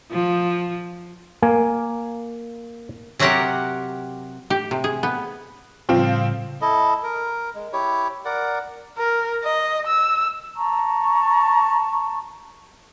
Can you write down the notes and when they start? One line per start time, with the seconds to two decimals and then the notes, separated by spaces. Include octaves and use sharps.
0.12 F3
1.42 A#3 G#5
3.19 C3 F#3 G4 A#4 F#5
4.50 G4
4.71 C3
4.84 G#4
5.03 B3
5.89 A2 C#3 F3 G3 C4 F4
6.62 E4 A4 D#5
7.03 A#4
7.55 G#3
7.73 E4 G4 C#5
8.25 A#4 D5 F#5
8.97 A#4
9.44 D#5
9.87 E6
10.56 A5 A#5 C#6